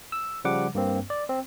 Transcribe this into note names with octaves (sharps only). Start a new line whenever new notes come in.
E6
C#3 F3 G3 F#5 D6
G2 A#3 C4
D5
C4